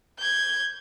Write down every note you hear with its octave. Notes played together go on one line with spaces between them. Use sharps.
G6 G#6